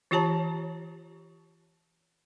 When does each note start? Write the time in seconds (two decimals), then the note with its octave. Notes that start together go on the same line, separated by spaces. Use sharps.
0.11 E3 F4 G4 C#5 A5 A#5